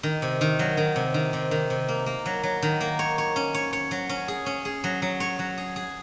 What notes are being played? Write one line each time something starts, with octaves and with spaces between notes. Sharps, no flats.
D#3
C3
D#3
F#3
D#3
C3
D#3
C3
D#3
C3
A#3
A#3
F#3
F#3
D#3
A#3
C#5
C#5
C#4
C#5
C#5
F#3
C#4
G#4
C#4
G#4
F#3
F#3
C#5
F#3
G#4
G#4